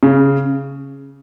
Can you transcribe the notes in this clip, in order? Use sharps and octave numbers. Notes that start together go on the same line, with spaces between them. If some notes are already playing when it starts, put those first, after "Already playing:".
C#3